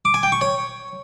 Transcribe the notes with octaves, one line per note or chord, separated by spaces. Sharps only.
D6
G#5
G5
C#6
C#5